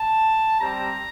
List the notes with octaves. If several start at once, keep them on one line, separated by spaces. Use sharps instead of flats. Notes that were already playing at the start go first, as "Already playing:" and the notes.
Already playing: A5
G3 C4 G4 A#5